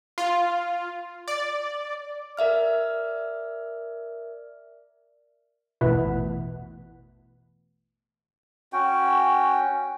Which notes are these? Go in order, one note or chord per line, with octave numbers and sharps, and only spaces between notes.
F4
D5
A#4 D5 E5 F6
A1 E2 B2 E3
C#4 F#4 G5